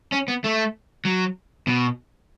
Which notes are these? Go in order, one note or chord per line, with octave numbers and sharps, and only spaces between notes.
C#4
B3
A3
F#3
B2